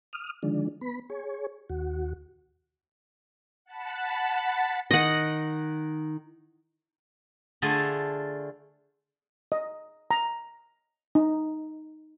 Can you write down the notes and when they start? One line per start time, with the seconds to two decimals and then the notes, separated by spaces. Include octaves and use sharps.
0.13 D#6 F6
0.43 D3 D#3 F3 G#3 D4
0.81 B3 B5
1.10 G#4 C#5
1.69 D#2 F#4
3.65 F#5 A5 B5
4.91 D#3 D#5 F#5
7.62 D3 A3 F4 G#4 A4
9.52 D#5
10.11 A#5
11.15 D#4